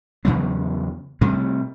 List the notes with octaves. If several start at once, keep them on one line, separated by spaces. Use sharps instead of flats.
E2 C#3 F#3 B3
C3 G3 A3